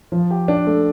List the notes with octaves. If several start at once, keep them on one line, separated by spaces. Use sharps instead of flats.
F3
G4
D4
A3